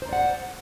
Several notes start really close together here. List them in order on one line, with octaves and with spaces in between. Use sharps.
C5 A#5 D5 F#5